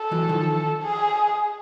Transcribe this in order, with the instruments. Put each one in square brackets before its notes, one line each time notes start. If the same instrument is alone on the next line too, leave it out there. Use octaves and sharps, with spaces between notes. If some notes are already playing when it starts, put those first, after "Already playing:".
Already playing: [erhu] A4
[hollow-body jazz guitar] E3 F#3
D#3 F3
[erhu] G#4